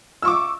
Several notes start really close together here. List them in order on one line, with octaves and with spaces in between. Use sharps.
E6 C#6 D6